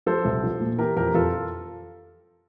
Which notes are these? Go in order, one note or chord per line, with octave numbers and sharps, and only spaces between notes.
F3 A4 C5
C2
F3
A#2
E3 G4 A#4
F2 G4 A#4
F2 F4 A4